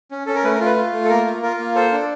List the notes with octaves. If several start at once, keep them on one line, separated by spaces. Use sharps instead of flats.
C#4
C#4 A4
A#4
A3 B4
A#4
F4
B4
F4
A3
A4
A#3 A#4
F4
F4 A#4
A#3
A4 C5
D4